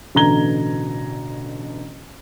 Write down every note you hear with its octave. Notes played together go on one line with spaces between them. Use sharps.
A1 B2 D3 A#5 G#6 G7